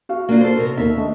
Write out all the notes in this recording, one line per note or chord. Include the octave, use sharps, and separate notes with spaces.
F#4 F5
A#3 D4 F4
A4 C5
C3 A#4
D#2 E5
A3 D4 D#5